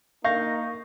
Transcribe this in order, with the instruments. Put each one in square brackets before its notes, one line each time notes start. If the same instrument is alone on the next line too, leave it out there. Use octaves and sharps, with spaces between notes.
[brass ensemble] A#3 D#4 [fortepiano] F5 [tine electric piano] C#6 G6 A#6